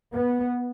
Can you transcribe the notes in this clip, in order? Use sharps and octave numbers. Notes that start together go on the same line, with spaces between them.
B3